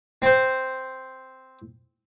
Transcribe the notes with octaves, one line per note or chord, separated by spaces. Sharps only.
C4 C5